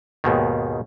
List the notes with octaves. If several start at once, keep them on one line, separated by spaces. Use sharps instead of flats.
D#2 G#2 B2 D#3